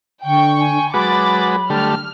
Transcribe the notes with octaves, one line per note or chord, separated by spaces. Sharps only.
D3 G5 C#6
G#5
F#3 G#3 F#4 B4 B5 D6 A6
D3 G3 A3 F6